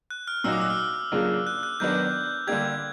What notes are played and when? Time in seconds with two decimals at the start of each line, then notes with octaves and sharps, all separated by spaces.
0.10 F#6
0.28 F6
0.44 A#2 F#3 A#3 D#4 F#4 E6
0.52 D6
0.61 E6
0.70 F6
1.12 C#3 F#3 A#3 D4 F4
1.47 F#6
1.63 F#6
1.80 D#3 F#3 B3 D4 F#4 G6
2.47 D3 G3 A#3 D4 G4 G#6